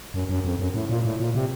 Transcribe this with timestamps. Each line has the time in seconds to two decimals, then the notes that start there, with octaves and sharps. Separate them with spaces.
0.14 F#2
0.29 F#2
0.45 F2
0.59 F#2
0.74 A2
0.89 A#2
1.05 A2
1.20 A#2
1.35 C3